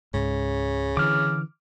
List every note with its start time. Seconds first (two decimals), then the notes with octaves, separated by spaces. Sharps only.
0.14 C#2 G#2 C#3
0.97 D3 E3 D6 F6